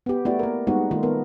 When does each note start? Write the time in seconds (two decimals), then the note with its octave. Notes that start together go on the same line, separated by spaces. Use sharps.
0.06 B3 G4
0.25 A3 B3 E4 F#4 G4 D5
0.39 A#3 A#4
0.67 G3 G#3 A#3 B3 D#4 F#4
0.91 D#3 A3 F4
1.03 B3 A#4